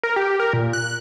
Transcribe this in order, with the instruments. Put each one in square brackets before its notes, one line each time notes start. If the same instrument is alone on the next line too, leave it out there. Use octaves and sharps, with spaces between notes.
[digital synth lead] A#4
G4
A#4
A#2
F#6